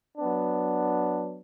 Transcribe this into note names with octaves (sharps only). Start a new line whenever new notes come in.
F#3 B3 D4